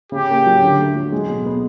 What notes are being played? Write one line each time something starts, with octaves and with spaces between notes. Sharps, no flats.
C#3 G4
A#3
F#3
D3
A3
F#3
G#3
B2
B3